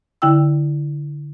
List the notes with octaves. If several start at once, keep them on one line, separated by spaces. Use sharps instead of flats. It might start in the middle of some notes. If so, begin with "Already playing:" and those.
D3 E4 G5 E6